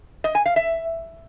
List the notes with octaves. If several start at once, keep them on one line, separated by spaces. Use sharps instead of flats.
D#5
G#5
F5
E5